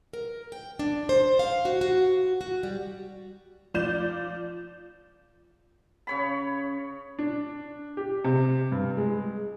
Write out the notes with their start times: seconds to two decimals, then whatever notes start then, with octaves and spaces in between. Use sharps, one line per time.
0.13 A#4
0.52 G5
0.79 D4
1.09 C5
1.39 F5
1.65 F#4
1.81 F#4
2.41 F#4
2.63 G3
3.74 F3 D5 G6 E7
6.07 C#3 C#5 B5
7.19 D4
7.97 G4
8.24 C3
8.72 G2
8.97 G#3